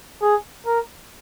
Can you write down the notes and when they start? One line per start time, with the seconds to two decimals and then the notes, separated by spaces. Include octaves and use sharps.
0.22 G#4
0.66 A#4